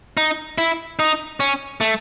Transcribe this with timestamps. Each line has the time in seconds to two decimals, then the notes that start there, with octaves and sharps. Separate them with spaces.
0.17 D#4
0.58 E4
0.99 D#4
1.40 C#4
1.81 A3